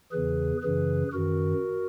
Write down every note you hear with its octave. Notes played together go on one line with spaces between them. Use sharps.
E2 C#3 E3 G#4 B4
F#2 C#3 E3 G#4 B4
F#2 D#3 F#4 A#4